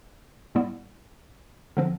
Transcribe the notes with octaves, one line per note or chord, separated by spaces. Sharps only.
A2 G3 B3 E4
D3 F3 C4